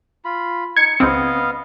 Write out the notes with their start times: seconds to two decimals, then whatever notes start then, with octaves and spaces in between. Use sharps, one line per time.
0.25 F4 B5
0.76 D#4 G#6 C#7
1.00 C#2 B3 C4 D#5 F5